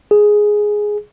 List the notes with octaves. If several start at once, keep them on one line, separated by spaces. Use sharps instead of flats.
G#4